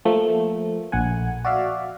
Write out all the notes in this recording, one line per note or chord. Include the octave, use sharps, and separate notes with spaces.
F3 A3 A#3
A#1 F#5 G#5
F#4 D5 E5 F5